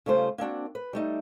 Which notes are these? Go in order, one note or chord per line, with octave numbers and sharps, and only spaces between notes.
C#3 G3 A3 F4 C5
A#3 C4 D4 F#4
B4
G3 A3 D#4